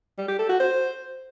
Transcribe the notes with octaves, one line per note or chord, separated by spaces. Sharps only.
G3
G4
A4
F#4
C5